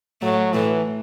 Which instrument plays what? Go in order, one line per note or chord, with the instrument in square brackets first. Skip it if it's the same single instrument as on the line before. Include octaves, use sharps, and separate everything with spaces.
[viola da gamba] A2 A3 [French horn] F#3
[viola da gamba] A2 A3 [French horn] E3